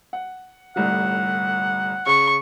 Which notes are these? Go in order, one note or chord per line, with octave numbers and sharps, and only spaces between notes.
F#5
G1 C2 A2 F#5
C#3 C#6